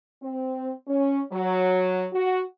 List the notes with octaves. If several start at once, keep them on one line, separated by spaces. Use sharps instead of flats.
C4
C#4
F#3
F#4